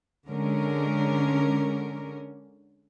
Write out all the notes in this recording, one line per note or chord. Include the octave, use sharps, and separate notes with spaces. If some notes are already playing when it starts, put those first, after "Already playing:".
D3 G#3 C#4 A#4